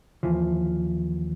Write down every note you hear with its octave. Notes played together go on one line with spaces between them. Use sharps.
D#2 E3 F3